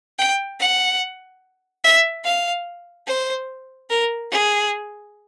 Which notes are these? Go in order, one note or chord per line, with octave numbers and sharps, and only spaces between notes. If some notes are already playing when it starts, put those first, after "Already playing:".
G5
F#5
E5
F5
C5
A#4
G#4